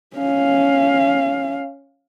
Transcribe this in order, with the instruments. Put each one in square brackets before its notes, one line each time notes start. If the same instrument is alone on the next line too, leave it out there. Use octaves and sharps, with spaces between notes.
[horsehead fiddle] C#4 F5